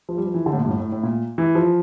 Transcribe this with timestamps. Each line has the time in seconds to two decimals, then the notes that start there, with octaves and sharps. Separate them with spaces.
0.09 F3
0.17 G3
0.26 F3
0.34 E3
0.46 D3
0.53 A2
0.58 A#2
0.65 G2
0.69 A2
0.80 A2
0.92 A2
1.03 A#2
1.38 E3
1.55 F3